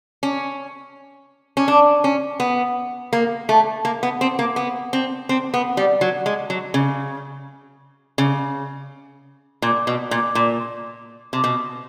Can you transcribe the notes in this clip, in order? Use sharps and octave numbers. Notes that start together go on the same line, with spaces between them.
C#4
C#4
D4
C#4
B3
A#3
A3
A#3
B3
C4
A#3
B3
C4
C4
B3
G3
F#3
G#3
F#3
C#3
C#3
A#2
B2
A#2
A#2
C3
B2